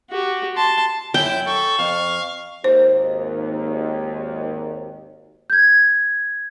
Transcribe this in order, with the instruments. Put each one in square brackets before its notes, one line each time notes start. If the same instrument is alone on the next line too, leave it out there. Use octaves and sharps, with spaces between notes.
[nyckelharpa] F#4 G4
A5 C6
[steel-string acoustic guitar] F#2 [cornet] E4 [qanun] G5 [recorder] G6
[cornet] A4 [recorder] C#6
[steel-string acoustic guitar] F2 [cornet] F5
[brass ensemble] G#1 D#2 [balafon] C5
[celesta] G6 G#6